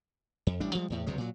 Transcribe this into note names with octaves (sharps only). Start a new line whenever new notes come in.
F2
A1 G3 D4
F3 G3 G#3
E2 A2
C#2 C3 F#3 G#3
A#2 F#3